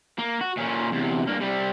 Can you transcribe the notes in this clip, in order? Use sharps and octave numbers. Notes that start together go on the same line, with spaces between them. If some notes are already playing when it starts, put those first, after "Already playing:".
A#3
F#4
A#2 C#4
E2 C3
G2 A#3
C3 G3